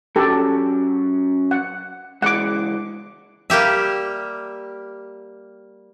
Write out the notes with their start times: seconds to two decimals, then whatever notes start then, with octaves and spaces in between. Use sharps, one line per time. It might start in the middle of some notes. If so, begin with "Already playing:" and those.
0.16 F#3 C#4 F#4 G4 A4
1.51 F#5
2.22 C#2 E3 G#3 F#5 D6
3.50 G3 A#3 G4 E5